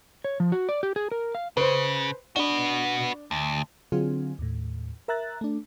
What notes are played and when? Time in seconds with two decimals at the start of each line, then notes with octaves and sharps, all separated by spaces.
0.24 C#5
0.40 F3
0.52 F#4
0.69 D5
0.83 G4
0.96 G#4
1.12 A#4
1.35 F5
1.57 C#3 B4 C5
2.36 D4 F#4 B4 G7
3.31 D2
3.92 D3 F#3 C4 F4 G#4
4.39 D#2 A2
5.08 A#4 E5 A#5 F#6 A6
5.41 A3 D4